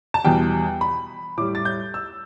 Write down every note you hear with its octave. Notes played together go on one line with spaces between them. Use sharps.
A5
E2 B2 G3 G5
B5
A2 G3 D6
A6
G6
E6